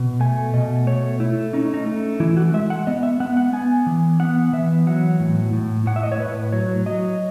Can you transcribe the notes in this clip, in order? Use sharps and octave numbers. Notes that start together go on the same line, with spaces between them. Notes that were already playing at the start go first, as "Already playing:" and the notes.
Already playing: B2
A3 G#5
B2 D#5
A3 C#5
A3 E4
C#4 D#4
D#4
A3
E3 E4
F#4
G#3 E5
F#5
B3 D#5
E5
B3 F#5
F#5
B3 G#5
E3
B3 F#5
E3 E5
F#3 F#5
A2
A2
A2 F#5
E5
D#5
C#5
A2 B4
F#3 C#5
F#3 D#5